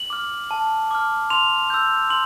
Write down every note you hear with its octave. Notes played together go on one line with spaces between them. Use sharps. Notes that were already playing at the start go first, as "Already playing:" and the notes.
Already playing: F#7
D6 F6
A5
D6 F6
C6 F7
E6 G6
C6 F#7